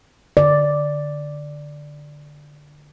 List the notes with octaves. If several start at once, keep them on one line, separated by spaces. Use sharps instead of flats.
D3 D5